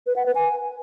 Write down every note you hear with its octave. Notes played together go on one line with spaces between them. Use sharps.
B4
F#5
B4
G#5